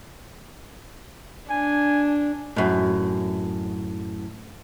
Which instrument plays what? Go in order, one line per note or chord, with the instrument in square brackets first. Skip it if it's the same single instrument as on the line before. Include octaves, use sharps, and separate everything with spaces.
[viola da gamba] D4 [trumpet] G#5
[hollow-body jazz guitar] F#2 A2